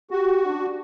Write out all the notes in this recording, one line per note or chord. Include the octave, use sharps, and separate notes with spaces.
F#4 G4
D4